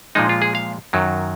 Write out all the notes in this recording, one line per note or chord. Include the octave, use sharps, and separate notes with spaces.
A#2 F3 G#3 D#4
F4
G#4
F5
F#2 D#3 F#3